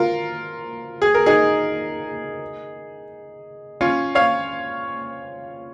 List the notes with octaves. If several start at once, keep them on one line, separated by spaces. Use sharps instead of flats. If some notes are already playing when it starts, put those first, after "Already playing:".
Already playing: F4 A#4
G#4
A#4
D#4 G#4
C#4 F4
C#5 F5